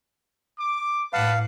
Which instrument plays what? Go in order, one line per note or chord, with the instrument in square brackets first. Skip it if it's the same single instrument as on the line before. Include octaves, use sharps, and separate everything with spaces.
[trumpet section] D6
[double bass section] A2 [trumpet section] B4 F#5 A5 [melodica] F5